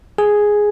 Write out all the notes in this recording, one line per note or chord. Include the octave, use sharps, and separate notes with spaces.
G#4